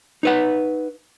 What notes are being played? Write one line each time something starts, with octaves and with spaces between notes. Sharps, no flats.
D#4 B4 F#5